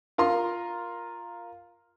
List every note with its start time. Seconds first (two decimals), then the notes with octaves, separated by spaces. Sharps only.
0.18 F4 A#4 A#5 C6